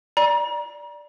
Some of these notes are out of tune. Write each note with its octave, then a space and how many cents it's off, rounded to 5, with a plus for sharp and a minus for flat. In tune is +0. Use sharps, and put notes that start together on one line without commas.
D5 +0 A#5 +35